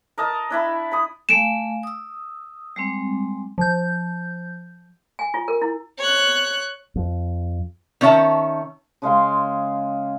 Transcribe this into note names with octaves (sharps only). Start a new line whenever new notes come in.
A#4 D#5 A5
D4 E4 B5
B5 D#6
A3 F5 G#5 D7 E7
D#6 E6
G3 G#3 C4
F3 G6
G#5
F4
A#4
E4
C#5 F#6
F2
D#3 C#4 C#5 E5 A5
C#3 G#3 F5 C6